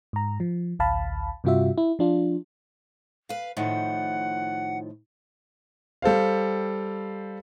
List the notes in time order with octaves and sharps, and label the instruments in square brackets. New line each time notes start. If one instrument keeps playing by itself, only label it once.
[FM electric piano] G#2 A#5
F3
A1 D2 F5 A5 B5
G2 C3 G3 F4 F#4 E5
E4
F3 D4 F4
[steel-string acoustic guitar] B4 F5
[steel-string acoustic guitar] A2 D#3 F3 [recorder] F#5
[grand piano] G3 A4 C5 F5